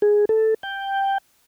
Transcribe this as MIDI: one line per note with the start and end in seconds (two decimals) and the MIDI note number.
0.02 0.25 68
0.29 0.54 69
0.63 1.18 79